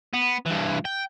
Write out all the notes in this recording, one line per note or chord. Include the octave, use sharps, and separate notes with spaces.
B3
G2 E3
G5